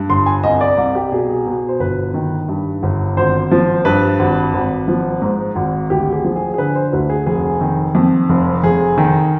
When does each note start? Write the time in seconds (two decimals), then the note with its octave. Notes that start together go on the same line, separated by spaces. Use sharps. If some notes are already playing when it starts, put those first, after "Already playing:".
Already playing: G2
0.09 G1 C6
0.26 G#5
0.43 C2 D#5
0.61 D5
0.78 C2 D5
0.95 G4
1.12 B2 G#4
1.46 B2
1.68 C5
1.80 G1 B4
2.14 D#3
2.48 G2
2.83 G1
3.17 G#1 C5
3.51 F3
3.85 G2 B4
4.19 G#1
4.54 G#1
4.88 F3
5.22 G#2
5.56 G#1
5.90 D2 G4
6.13 G#4
6.24 F3
6.36 G#4
6.54 G#4
6.58 D3 B4
6.75 C5
6.93 D2 B4
7.10 G#4
7.27 F1 G#4
7.61 D#3
7.95 F2
8.29 F1
8.63 F1 G#4
8.98 D#3